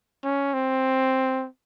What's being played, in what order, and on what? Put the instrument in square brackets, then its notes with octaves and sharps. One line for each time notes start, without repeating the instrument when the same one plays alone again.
[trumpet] C#4
C4